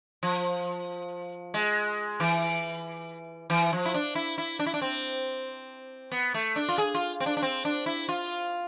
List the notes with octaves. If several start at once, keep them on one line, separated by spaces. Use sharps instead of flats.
F3
G#3
E3
E3
F3
E4
D4
E4
E4
D4
E4
D4
C4
B3
A3
D4
F4
G#4
F4
C4
D4
D4
C4
D4
E4
F4